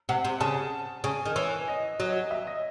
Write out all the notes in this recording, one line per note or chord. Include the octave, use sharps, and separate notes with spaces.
C3 F#5
C3
C#3 A5
C#3 G#5
D#3
E3 C#5
D#5
F#3 D#5
E5
D#5